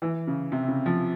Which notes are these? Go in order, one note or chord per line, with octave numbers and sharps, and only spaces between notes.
E3
C#3
C3
C#3
F3